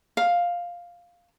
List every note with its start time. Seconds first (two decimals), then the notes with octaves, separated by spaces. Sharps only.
0.17 F5